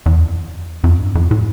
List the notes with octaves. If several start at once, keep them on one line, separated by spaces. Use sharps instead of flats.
E2
F2
F2
G2
F2
A2